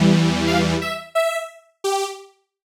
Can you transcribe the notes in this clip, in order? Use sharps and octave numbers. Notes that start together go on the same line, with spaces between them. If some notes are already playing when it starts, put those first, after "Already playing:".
Already playing: E2 E3 G3
F5
E5
E5
G4